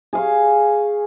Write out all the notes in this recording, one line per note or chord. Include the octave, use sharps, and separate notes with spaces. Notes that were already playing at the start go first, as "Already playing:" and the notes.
G#4 F5 C#6